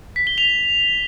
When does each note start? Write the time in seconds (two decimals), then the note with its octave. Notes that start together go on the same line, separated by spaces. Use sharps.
0.16 B6
0.27 G7
0.38 F7